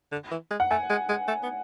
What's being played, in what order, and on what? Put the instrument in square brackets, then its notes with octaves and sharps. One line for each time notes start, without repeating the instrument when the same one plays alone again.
[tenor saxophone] D3
E3
G#3
[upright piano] F#5
[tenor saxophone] A3 [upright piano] G#5
[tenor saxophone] G#3
G#3
A3
B3